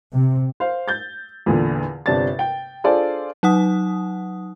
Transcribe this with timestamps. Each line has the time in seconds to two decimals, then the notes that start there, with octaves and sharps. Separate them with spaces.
0.11 C3
0.60 C5 F5
0.88 G6 A6
1.46 E2 A#2 D3
2.06 G1 C3 D4 A6
2.39 G5
2.84 D4 F4 G#4 A4 C5 D5
3.43 F#3 D#4 F#5 D#6